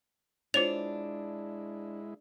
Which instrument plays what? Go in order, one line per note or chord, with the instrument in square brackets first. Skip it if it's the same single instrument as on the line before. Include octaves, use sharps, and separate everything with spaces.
[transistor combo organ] G#3 E4 [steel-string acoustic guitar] D4 [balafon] F4 C5 C#5 [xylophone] F7